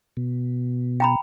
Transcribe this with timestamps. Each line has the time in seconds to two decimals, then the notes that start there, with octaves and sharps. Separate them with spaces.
0.17 B2
1.00 G5 A#5 B5